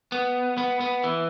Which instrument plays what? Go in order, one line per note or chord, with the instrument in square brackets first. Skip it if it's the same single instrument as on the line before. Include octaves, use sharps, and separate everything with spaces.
[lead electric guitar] B3
B3
B3
E3